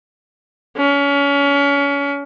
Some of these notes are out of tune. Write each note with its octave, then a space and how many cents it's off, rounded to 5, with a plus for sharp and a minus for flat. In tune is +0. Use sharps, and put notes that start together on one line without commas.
C#4 +30